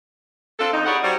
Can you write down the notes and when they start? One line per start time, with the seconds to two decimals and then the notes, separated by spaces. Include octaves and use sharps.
0.60 C4 D4 F4 A4
0.73 F2 D#4
0.86 E4 G4 G#4 C#5 D5 F#5
1.03 F#3 G3 C5